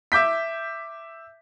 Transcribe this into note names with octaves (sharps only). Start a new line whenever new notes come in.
E5 D6 G6 B6